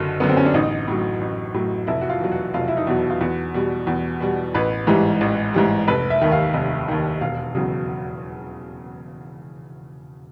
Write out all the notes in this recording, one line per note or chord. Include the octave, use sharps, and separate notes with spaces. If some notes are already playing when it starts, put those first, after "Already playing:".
Already playing: F#1 F#2 D3
F#2 D3 B3
C4
C#4
D4
A1 D#4
A2 F#3
A1
A2 F#3
F1 E4
F#4
F4
E2 B2 F#3
F#4
F1 F4
E4
D#4
E2 B2 F#3
F4
E2 F#4
B2 G3
E2
B2 G3
A1 B4
G#2 E3 G3
A1
G#2 E3 G3
F1 B4
E5
D#2 D#3
F5
F1
D#2 D#3
E1 F5
E2 C#3 F#3